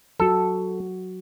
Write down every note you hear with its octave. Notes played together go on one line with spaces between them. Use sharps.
F#3 F#4 A4